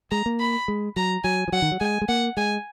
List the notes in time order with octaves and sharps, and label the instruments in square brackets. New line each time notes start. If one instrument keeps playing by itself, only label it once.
[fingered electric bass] G#3 [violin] A#5
[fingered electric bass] A#3
[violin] B5
[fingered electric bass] G#3
[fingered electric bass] F#3 [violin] A#5
[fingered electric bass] F#3 [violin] G#5
[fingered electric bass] F3
[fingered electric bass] F#3 [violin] F#5
[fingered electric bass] D#3
F#3
[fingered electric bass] G#3 [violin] G#5
[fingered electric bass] G#3
[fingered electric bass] A#3 [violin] F#5
[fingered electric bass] G#3 [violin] G#5